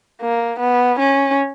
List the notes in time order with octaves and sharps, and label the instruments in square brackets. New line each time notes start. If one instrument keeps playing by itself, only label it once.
[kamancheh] A#3
B3
C#4